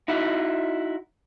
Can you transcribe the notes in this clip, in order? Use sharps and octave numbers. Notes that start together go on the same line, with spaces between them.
D#4 E4 F#4